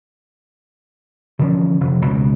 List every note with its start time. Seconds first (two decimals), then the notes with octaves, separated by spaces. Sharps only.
1.39 D3 E3 F3 C#4
1.80 F1
2.02 C#2 B2